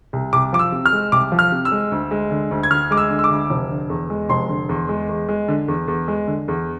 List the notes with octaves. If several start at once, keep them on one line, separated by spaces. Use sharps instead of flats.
C2
C2 D6
F3 D6
E6
C3
F6
G#3
C2 D6
F3
F6
C3
E6
G#3
D2
G#3
D3
D2
G#6
D2 F6
G#3 D6
E6
D3
E6
D6
D2
F1
D3
E2
G#3
F1 C6
D3
E2
G#3
E2
G#3
D3
E2
E2
G#3
D3
E2